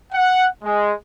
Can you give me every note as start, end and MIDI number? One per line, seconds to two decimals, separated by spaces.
0.13 0.47 78
0.64 0.93 56